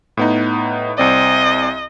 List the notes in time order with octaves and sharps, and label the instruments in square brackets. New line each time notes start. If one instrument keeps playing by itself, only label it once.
[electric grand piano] A2 B3 D#4
[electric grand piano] C2 C4 D5 [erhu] D#5